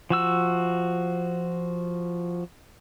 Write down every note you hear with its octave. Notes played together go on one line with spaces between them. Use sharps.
F3 F#4 E6